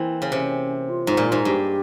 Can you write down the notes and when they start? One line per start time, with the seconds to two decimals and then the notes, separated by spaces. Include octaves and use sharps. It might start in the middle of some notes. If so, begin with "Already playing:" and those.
Already playing: E3 A#3 C4 E4
0.22 C#3
0.32 C3 C#4
0.89 F4
1.07 G#2
1.17 A#2
1.32 G#2
1.45 G2 G4